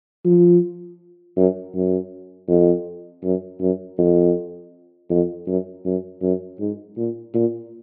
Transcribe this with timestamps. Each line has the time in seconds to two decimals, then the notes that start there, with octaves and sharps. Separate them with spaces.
0.25 F3
1.36 F#2
1.75 F#2
2.48 F2
3.23 F#2
3.60 F#2
3.98 F2
5.10 F2
5.47 F#2
5.85 F#2
6.22 F#2
6.60 G#2
6.97 A#2
7.34 A#2